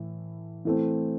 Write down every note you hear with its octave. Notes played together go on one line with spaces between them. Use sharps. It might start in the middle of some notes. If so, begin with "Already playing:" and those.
Already playing: A2 E3
E3 A3 C4